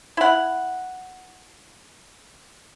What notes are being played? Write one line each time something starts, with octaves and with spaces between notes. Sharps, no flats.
E4 F#5